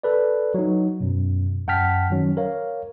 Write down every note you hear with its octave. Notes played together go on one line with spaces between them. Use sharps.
A4 B4 D5
F#3 D#4
F#2 B2
F#2 F#5 G5 A5 F6 B6
D#3 F#3 C#4
A#4 C#5 F5